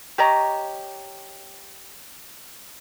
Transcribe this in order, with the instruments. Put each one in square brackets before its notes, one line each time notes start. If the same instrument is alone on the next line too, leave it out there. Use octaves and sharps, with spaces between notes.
[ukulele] G4 C#5 D#5 A#5